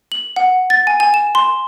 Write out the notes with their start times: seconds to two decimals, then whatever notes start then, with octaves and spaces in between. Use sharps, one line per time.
0.12 F#7
0.36 F#5
0.70 A6
0.87 G#5
1.00 G#5
1.14 E7
1.35 C6